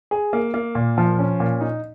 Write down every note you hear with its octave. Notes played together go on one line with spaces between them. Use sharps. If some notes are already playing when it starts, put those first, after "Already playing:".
G#4
A#3
A#3
A#2
F3
C#4
A#2
D#4